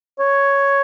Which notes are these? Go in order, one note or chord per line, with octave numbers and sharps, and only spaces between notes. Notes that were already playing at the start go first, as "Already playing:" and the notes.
C#5